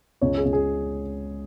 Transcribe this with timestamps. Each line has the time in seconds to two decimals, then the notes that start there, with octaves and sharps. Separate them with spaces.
0.21 C#2 C#5
0.37 G#4
0.45 C#2
0.53 G#4